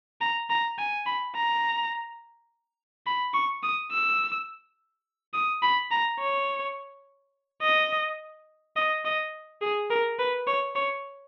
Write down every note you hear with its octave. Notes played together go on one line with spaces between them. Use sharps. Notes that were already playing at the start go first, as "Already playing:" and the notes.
A#5
A#5
G#5
B5
A#5
B5
C#6
D#6
E6
D#6
B5
A#5
C#5
D#5
D#5
D#5
G#4
A#4
B4
C#5
C#5